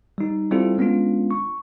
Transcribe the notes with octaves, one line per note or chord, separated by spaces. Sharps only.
G3 D#4
G3 C4 E4 F4 A4
G#3 B3 C#4 D4 F4
C#6